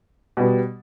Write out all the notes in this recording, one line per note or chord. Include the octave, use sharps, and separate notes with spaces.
B2 G3 B3